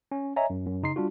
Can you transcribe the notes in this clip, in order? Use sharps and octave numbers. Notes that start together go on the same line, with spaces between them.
C#4
C#5 D#5 E5 G#5 A#5
F#2
F#2
C#3 D#4 C6 C7
G3 D4 F4 F#4